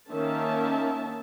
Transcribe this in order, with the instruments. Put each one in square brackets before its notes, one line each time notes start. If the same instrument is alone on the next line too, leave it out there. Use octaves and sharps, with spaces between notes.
[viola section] D#3 A#3 C#4 E5 A5